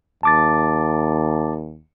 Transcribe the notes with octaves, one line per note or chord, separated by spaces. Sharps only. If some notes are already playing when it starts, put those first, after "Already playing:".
D#2 A5 D6 A6